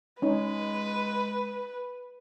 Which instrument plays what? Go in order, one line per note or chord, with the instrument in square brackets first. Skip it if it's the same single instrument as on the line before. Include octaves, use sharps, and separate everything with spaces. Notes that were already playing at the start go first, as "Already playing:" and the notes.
[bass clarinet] G#3 [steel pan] C#4 D#4 [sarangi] B4